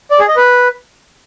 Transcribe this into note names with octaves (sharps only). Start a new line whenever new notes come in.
D5
G#4
D#5
B4